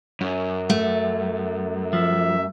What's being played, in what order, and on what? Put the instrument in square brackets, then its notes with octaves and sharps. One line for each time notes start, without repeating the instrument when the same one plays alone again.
[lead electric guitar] F#2
[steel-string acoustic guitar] A3
[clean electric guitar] F3 [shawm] E5